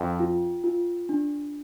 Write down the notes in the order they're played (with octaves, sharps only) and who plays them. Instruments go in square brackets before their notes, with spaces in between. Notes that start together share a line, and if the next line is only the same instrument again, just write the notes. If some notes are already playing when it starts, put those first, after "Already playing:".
Already playing: [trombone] F2 [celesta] G5
[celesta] F4
F4
D4